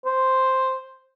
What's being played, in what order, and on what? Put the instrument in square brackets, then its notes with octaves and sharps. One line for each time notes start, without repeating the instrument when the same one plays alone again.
[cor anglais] C5